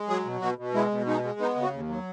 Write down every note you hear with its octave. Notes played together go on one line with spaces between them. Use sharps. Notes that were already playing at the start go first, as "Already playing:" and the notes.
Already playing: G#3
F#3 G#4
B2
B2 F#4
B2
G#3 E4
B2
G#3 D#4
G#3
B3 D#4
C#3
F#4
D#2
F#3